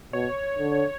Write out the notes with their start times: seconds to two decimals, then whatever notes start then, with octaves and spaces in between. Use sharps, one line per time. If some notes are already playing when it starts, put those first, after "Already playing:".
0.13 B2 C#5
0.58 D3